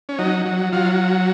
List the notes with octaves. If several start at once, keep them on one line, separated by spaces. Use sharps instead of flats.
C#4
F#3 D#4
F#3
F#3 F4